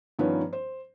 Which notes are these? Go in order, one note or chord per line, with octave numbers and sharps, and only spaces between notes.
G2 D#3 F3 B3 C#4 D#4
C5